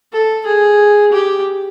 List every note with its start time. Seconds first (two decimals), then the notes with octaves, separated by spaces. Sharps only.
0.12 A4
0.46 G#4
1.12 G4